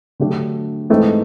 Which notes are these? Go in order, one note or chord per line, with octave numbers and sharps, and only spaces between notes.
D3 F#3 A3 D4 G4
G#2 E3 A3 C4 D#4